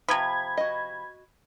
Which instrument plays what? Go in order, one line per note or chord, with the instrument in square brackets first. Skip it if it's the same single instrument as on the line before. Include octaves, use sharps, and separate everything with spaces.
[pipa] C3 F3 [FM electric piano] B5 G#6
[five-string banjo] F#4 D#5